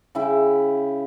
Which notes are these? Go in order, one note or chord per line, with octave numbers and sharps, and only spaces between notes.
C#3 E4 G5